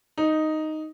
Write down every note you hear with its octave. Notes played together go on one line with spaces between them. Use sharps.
D#4